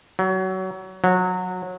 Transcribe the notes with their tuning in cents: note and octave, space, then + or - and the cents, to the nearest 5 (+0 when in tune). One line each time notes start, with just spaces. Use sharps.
F#3 +25
F#3 -20